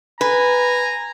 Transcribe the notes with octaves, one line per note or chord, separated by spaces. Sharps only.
B4 G#5 A#5